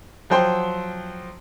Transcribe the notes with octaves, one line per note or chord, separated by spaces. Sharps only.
F3 F#3 C5 G5 C6